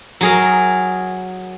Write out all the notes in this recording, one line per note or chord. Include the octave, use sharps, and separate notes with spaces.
F#3 G#4 A#4